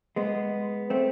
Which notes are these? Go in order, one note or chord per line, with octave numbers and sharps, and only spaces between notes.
G#3 B3
A3 C4